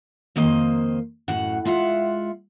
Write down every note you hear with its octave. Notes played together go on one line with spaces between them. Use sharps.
F2 D#3 A#3 C5 D#5
F#2 A2 F#5
G#3 F4 E5 F#5